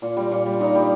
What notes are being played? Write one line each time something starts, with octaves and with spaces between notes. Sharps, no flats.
A#2
G3
A#2
G3
A#2 D#4
G3